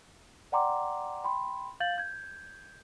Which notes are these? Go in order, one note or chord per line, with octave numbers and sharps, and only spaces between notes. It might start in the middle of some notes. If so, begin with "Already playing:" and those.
D5 F#5 G5 A#5 C6 D6
G5 B5 C6
F5 G6 A6 F#7
G6 G#6